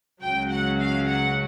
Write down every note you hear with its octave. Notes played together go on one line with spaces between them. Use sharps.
C#2 C#3 F#3 G5
F#5
F5
F#5